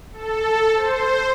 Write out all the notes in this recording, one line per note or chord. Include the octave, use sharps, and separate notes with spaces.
A4
C5